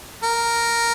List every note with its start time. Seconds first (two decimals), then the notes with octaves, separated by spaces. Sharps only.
0.23 A#4